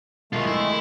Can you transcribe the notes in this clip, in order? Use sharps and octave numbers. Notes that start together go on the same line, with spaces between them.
B1 D#3 G#3 A3 F4
E4